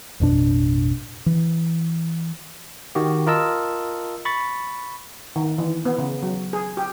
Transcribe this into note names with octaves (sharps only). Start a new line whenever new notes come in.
A1 F2 B2 D4
E3
D#3 F#4 G4
F4 A#4 D#5 A5 E6
B5 C#6 A6
D#3
E3
B3
C#3
F#3
G#4
G4